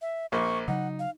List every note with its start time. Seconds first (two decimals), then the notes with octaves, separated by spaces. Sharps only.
0.02 E5
0.32 A#1 A#3 C5 C#6
0.68 C#3 F#3 D#4 F#5
0.99 F5